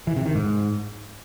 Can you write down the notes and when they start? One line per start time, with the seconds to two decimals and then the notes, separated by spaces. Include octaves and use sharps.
0.07 E3
0.16 C3
0.26 D#3
0.35 G#2